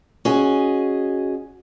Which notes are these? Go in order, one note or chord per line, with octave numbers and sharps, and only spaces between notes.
C#4 F#4 G#4 D#5